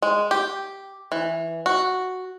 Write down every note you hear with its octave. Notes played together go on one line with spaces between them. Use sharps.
G#3
G4
E3
F#4